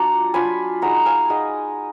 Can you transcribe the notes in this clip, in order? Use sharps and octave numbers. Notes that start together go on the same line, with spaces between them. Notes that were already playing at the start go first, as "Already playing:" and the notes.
Already playing: F#3 D4 F4 A#5 D6
F#3 D4 F4 G#5 B5
G#3 D#4 F#5 A#5
F5 G#5
G#3 D#4 D#5 F#5